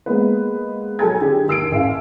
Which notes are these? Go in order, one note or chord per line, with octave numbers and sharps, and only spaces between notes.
G#3 A#3 B3 B4
F#3 A4 G#5 A#5 G#6
D3 G4 G#4
D#2 E6 C7 D7
A1 E5 F5